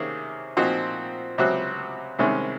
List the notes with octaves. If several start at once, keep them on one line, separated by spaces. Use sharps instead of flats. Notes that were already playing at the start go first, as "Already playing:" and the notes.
Already playing: C3 D#3 A#3 C#4 G#4
A#2 F3 C4 D#4 F#4
C#2 C3 F#3 C4 F#4
C2 C3 D#3 G#3 C#4